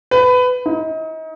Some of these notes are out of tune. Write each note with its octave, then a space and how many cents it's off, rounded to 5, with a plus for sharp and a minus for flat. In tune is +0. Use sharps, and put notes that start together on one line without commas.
B4 +20
D#4 +35